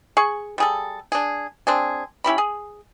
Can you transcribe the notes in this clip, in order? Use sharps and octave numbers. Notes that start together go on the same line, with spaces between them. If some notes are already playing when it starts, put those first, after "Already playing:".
G#4 C#6
G3 G#4 A4
D4 G#4
C4 D4 G#4
C#4 E4 G4 B5
G#4